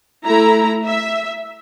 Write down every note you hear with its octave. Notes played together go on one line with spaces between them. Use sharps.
A3 E4 A#5
E5